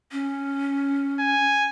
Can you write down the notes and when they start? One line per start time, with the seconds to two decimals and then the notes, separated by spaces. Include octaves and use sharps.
0.12 C#4
1.20 G#5